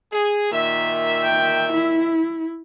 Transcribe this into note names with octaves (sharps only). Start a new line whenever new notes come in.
G#4
A#2 D#3 E5
G5
E4